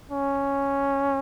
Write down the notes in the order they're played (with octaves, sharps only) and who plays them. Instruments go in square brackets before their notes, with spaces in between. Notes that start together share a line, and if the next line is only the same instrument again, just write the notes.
[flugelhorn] C#4